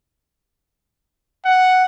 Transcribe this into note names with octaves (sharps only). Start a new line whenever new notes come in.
F#5